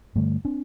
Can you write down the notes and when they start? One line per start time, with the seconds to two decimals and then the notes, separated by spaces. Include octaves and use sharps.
0.15 G2 D3 G3 A3
0.45 C4 D4